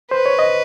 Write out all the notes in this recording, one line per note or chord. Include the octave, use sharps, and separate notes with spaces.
B4 C5
C#5
D#5